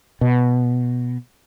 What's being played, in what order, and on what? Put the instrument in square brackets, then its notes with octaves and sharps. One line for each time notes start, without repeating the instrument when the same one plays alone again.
[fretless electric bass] B2